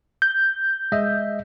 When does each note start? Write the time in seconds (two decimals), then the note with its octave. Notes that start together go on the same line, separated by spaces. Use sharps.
0.22 G6
0.92 G#3 D#5 E5